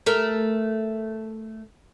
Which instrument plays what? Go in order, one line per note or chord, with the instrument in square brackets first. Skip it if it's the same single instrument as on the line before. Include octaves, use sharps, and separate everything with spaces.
[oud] A3 A#4